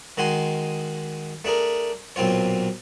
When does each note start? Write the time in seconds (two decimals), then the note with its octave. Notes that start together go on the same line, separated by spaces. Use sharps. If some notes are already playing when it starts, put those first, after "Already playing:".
0.17 D#3 G#3 F#4 G#5 C6
1.45 A3 D4 G#4 A#4
2.16 B1 A#2 C4 F4 C#5